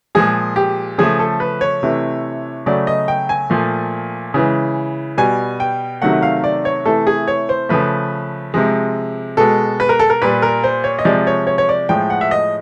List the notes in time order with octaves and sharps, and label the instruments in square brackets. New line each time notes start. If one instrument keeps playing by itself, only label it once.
[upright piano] A#2 F3 G#3 G#4
G4
C#3 F3 A3 G#4
A4
B4
C#5
C3 E3 A3
C#3 F#3 A3 D5
D#5
G5
G#5
A#2 F3 A3
C#3 E3 G#3
B2 G3 G#5
G5
C3 D#3 F#3 A3 F#5
F5
D5
C#5
C3 E3 A3 A4
G#4
C#5
C5
C#3 F3 A3 B4
C3 F3 G#3
B2 G#3 A4
B4
A#4
A4
A#4
A#2 G3 B4
A#4
C5
C#5
D#5
C3 F3 G#3 D5
C#5
C#5
C#5
D5
A2 F3 G#3 G5
F#5
E5
D#5